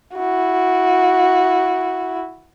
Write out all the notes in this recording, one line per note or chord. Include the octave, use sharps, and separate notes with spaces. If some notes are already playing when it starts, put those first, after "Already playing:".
E4 F#4